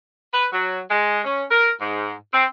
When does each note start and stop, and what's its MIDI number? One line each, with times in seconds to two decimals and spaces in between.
0.33 0.46 71
0.52 0.79 54
0.89 1.21 56
1.25 1.44 61
1.50 1.70 70
1.80 2.13 44
2.33 2.45 60